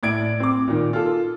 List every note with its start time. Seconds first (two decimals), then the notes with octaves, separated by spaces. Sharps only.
0.03 A2 D5 G#6 D7
0.40 C4 D6
0.68 A#2 D#3
0.93 F4 A4